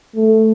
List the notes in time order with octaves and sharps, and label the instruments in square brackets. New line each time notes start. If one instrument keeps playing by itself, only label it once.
[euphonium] A3